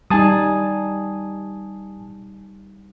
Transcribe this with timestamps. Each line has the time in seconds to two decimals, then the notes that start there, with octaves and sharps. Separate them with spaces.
0.10 G3 D#4 G#5 A5 D#6